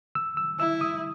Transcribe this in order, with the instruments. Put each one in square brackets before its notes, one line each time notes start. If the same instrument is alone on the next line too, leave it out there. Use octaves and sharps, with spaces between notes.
[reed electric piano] E6
E6
[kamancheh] E4 [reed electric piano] E6
[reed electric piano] D#6